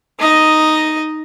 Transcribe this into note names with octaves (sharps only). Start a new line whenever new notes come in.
D#4 D#5